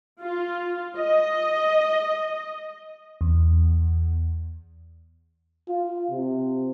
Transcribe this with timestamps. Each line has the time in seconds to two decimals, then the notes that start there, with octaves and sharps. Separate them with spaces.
0.21 F4
0.97 D#5
3.21 E2
5.69 F4
6.11 C3